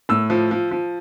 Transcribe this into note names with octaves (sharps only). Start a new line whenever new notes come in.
A2 E6
F3
F3
F3